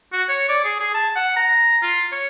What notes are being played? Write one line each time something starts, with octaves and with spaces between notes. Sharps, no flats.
F#4
C#5
D5
G#4
G#4
A5
F#5
A#5
F4
C#5